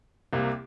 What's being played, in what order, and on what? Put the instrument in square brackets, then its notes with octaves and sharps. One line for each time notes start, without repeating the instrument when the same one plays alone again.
[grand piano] C2 C3 A#3